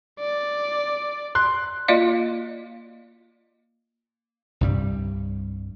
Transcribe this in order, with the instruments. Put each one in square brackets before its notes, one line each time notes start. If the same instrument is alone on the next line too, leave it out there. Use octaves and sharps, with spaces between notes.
[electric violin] D5
[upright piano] C6 F#6
[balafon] A#3 F4 F#4 D5 D#5 F5
[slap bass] C2 G2 G3